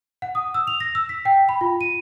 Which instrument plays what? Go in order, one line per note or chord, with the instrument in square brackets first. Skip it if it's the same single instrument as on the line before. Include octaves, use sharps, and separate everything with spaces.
[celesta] F#5
D#6
E6
F7
A#6
E6
B6
G5
B5
F4
D#7